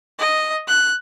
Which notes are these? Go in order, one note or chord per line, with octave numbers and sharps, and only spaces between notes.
D#5
F#6